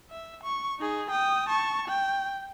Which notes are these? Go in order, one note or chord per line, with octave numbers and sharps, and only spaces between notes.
E5
C#6
D#4 G#4
G5 D#6
A5 C#6
G5